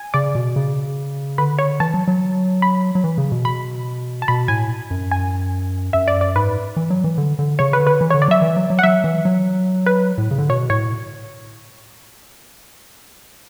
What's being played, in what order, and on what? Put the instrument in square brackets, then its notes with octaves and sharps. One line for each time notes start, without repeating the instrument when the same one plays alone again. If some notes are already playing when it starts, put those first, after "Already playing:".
Already playing: [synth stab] G#5
[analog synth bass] C#3 [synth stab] D5
[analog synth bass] B2
C#3
[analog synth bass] D3 [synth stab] B4
[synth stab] C#5
[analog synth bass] E3 [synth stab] A5
[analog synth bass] F#3
F#3
[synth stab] B5
[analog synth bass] F#3
E3
C#3
B2
[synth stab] B5
A5
[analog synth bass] B2 [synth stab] B5
[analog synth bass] A2 [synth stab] G#5
[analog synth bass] F#2
[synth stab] G#5
[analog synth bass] F#2 [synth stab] E5
[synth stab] D5
D5
[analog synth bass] G#2 [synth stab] B4
[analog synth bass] E3
F#3
E3
D3
D3
[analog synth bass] C#3 [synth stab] C#5
[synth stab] B4
[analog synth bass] D3
[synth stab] B4
[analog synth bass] E3
[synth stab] C#5
[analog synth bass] D3
[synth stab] D5
[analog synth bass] F#3 [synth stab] E5
[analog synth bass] E3
F#3
F#3
[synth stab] F#5
[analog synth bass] F#3 [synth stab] E5
[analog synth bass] E3
F#3
[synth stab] B4
[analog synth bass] A2
C#3
D3
[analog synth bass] B2 [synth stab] C#5
[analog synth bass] A2 [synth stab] C#5